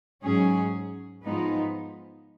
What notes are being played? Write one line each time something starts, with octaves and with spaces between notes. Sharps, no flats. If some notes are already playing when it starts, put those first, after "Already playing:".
G#2 F#3 C#4 G#4
G#2 F3 G#3 B3 D#4